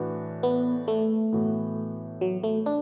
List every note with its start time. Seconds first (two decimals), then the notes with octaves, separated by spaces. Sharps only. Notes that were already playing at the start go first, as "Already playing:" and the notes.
Already playing: A2 E3 D4 F#4
0.43 B3
0.88 A3
1.32 A2 E3 B3 F#4
2.21 F#3
2.43 A3
2.66 D4